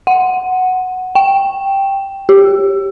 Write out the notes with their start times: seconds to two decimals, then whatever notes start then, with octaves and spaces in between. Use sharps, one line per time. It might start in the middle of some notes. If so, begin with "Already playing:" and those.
0.07 F#5
1.15 G5
2.29 G4